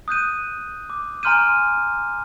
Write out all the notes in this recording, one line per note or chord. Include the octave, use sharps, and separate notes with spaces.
D#6 F#6 G6 D#7
D6
G#5 A#5 C6 F6 G6 D#7